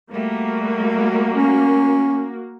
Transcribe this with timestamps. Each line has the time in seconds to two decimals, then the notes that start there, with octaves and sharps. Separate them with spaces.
0.11 G3 A3 A#3 F#4
1.35 C#4